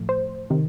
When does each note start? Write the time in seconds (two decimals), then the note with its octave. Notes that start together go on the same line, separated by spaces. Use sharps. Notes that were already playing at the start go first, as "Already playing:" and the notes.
Already playing: A2 F3 A3
0.09 C5
0.50 C3 D#3